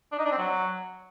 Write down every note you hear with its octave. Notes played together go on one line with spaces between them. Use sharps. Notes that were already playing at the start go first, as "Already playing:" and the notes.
D4
D#4
D4
C4
F#3